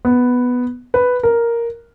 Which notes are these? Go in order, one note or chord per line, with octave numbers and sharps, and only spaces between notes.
B3
B4
A#4